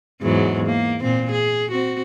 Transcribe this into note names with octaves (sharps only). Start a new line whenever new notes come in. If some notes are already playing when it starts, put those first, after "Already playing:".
E2 G#2 F#3
A#3
A#2 C4
G#4
C4 F#4